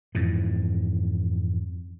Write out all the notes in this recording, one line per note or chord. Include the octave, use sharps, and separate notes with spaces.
F2 G#2 E3